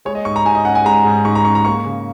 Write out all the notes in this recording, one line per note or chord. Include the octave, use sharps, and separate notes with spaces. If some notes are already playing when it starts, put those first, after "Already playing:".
G#3 C#5
D#5
G#2 C#6
A#5
G#2 G#5
D#5
C#4 F#5
G#5
G#3 A#5
G#2
G#2 C#6
A#5
C#4 C#6
A#5
A#3 C#6
C#3